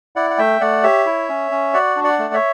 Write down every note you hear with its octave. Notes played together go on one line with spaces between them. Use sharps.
E4 D5 F#5
F#5
A3 E5 G5
A3 D5 F#5
G4 C#5 E5
E4
C#4
C#4
F#4 D5 F#5
D4
D5 F#5
A3
C#5 E5